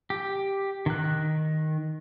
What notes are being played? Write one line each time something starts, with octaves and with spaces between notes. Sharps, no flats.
G4
D#3 F#6